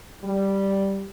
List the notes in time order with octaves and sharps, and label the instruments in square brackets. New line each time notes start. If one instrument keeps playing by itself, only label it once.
[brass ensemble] G3